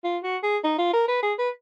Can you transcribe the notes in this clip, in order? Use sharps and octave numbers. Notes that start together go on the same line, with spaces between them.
F4
F#4
G#4
D#4
F4
A#4
B4
G#4
B4